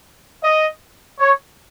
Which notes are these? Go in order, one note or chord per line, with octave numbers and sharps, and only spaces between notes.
D#5
C#5